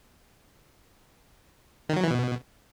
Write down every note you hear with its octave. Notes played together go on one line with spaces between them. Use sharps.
D#3
F#3
E3
B2